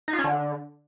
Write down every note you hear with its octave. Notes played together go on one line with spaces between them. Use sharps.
D#4
F4
C#4
D3